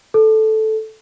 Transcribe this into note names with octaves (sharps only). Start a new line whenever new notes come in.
A4